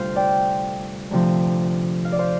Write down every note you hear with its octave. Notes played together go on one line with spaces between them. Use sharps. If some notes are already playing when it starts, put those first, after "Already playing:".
Already playing: D2 C3 G3 F4 C5 F5
D5 G5
D2 C3 F3
F5
D5
C5 F5